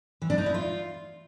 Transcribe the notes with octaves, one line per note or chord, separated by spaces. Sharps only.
E3
D4
D#4
E4
F4